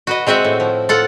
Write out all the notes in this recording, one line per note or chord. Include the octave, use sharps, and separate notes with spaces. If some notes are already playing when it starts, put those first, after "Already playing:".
F#4 B4 D#5
G#3 C4 F#4 E5 F#5
A2
F3
F4 A4 F#5